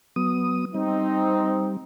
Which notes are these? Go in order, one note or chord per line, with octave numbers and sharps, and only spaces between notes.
F#3 B3 D#6
G3 C4 D#4